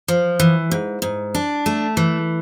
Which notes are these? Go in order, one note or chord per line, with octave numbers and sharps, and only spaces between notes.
F3
E3
G#2
G#2
D4
A3
E3